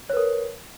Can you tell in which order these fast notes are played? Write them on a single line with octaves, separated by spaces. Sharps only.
C#5 B4 A#4